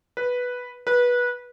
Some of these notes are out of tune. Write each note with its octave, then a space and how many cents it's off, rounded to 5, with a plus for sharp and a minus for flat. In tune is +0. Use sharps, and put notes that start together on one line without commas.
B4 -5
B4 -20